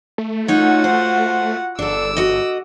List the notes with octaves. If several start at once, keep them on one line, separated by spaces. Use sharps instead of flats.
A3
D#4 F4 F#4 C#5 F#5
C5
G1 D4 A4 D6 E6
F#4 D#5